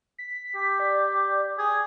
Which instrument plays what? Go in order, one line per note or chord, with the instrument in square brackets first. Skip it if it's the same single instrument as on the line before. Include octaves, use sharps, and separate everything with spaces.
[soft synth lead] B6
[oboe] G4
[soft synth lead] D5
[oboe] G#4 [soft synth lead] G#6